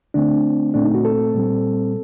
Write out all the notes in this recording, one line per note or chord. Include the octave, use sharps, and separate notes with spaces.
D3 A3 C4 D4
A#2 A3 C4 D4
D#4
F#4
A4
A#2 G3 C4